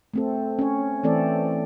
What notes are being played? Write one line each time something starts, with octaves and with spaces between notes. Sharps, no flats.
A3 C4 A4
C#4 C#5
E3 A3 C4 A4 D5